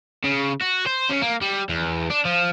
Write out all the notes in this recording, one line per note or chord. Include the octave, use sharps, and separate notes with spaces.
C#3
F#4
C5
C#3
A#3
G3
E2
D4
F3